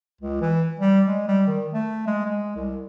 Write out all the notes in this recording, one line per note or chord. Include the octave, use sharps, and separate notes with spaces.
C#2
E3
G3
G#3
G3
D#3
A3
G#3
G#3
C2